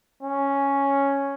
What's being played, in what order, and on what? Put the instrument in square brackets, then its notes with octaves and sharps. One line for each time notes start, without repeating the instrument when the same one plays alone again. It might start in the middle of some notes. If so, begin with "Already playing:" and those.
[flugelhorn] C#4